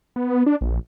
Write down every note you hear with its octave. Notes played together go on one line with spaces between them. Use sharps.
B3
D4
A#1